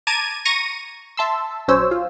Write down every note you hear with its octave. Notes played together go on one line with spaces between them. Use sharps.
A5 A#5 D6 G#6 D#7
A#5 C#6 A#6 D#7
E5 A5 C6 E6
A#1 F#3 C#4 C5 C#5 E6
F4